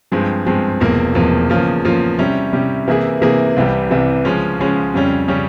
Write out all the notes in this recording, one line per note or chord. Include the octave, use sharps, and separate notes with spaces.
G2 F3 G#3 C4
G2 F3 G#3 C4
E1 E2 C3 F3 A#3
E1 E2 C3 F3 A#3
E2 C#3 F3 A#3 F4
E2 C#3 F3 A#3 F4
C3 G3 C#4 E4
C3 G3 C#4 E4
C3 E3 A#3 E4 G#4
C3 E3 A#3 E4 G#4
C2 C3 E3 G3
C2 C3 E3 G3
C#3 F3 G#3 C#4
C#3 F3 G#3 C#4
F2 C#3 G3 C#4
C#3 G3 C#4